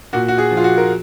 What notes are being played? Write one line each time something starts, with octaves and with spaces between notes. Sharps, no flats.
A#2 F#4
F#4
G#4
F3
F4
F#4
A#4